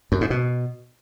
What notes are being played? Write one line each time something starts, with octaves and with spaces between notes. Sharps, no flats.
F#2
G#2
B2